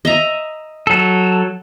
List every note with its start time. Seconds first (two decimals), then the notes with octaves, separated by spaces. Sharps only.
0.05 D#5 E5 A#5
0.87 F#3 A4